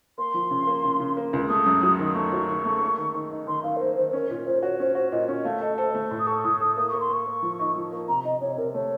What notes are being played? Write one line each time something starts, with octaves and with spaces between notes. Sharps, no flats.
A#3 C6
F3
C#3
A#3
C#3
C#3
A#3
C#2
A3 D#6
F#2
F#3
D#3
A3 C#6
F#3
D#3
A3
A#3
D#3
D#3
D#4
D#3 C6
D#3 F5
A#4
A#3 C5
D#3 C5
C#4 A#4
A#2
A#2 C5
F#4 C#5
C#4 C5
F#4 C5
A#2 D#5
C#4
A3 F5
A4 D#5
A4 C5
A3
A2
D#6
A4 C#6
A2 D#6
A4 D#6
A#3 D#6
A#3 C#6
C6
A#3 C#6
A#3
F3
D#4
F3
A#3
C3 A#5
C3 D#5
C3 C#5
C3 A#4
A3 C#5